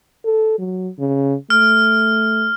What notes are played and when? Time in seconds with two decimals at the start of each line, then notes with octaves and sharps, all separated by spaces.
0.24 A4
0.59 F#3
0.99 C#3
1.50 A3 F6